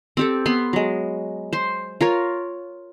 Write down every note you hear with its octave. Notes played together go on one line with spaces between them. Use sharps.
C4 G4 A4
B3 B5 C6
F#3 G#3
C5 C6
F4 A#4 C#5